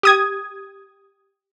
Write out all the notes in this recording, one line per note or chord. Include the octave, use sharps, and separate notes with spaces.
G4 D#6 G#6